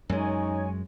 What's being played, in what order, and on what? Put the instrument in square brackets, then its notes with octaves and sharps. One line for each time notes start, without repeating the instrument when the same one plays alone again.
[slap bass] F#2 G#3 [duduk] D#4 [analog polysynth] C#5 G#5